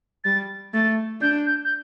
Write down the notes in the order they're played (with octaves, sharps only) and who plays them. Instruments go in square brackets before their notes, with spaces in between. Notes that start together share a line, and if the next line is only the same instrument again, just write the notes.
[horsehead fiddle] G3 [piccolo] A6
[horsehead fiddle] A3 [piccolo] A6
[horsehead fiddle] D4 [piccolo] G6
[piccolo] G6
G6